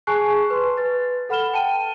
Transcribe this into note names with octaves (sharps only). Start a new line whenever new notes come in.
G#4 G#5 A5 C#6 F#6 C7
B4 C6
B4 A6
A4 F#5 B5 F6 E7 G7
G5 A5 D#7